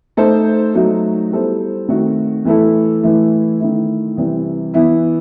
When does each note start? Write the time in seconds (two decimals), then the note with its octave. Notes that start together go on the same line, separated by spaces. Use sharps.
0.17 A3 D#4 A4 C5
0.74 F#3 A3 D#4 F#4
1.31 G3 B3 E4 A4 C5
1.89 D#3 A3 C4 F#4
2.45 E3 A3 E4 A4
3.02 E3 A3 E4
3.60 D#3 A3 E4
4.17 C3 E3 G3 C4
4.74 E3 B3 E4